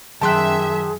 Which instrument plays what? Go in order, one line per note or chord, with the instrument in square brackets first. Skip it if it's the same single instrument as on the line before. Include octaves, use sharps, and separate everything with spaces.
[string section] F#2 E5 [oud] D#3 G4 [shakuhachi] G#4 [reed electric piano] A5 C6 F#6